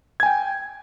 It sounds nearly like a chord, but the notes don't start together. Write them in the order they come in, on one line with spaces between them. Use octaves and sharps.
G#6 G#5 G5